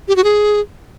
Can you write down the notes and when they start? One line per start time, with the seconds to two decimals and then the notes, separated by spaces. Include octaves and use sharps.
0.08 G4
0.16 F#4
0.24 G#4